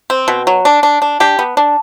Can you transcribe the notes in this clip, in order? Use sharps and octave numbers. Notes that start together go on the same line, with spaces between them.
C4
B2
F#3
D4
D4
D4
D4 G4
B3
D4